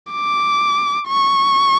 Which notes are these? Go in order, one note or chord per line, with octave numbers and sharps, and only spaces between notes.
D6
C#6